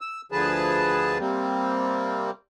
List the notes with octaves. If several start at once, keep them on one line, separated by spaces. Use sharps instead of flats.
E6
D2 D3 F3 G#4 B4 A5
C3 G3 A#3 C4